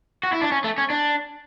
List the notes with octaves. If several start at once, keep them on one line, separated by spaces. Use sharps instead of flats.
F#4
E4
D4
C#4
A3
C#4
D4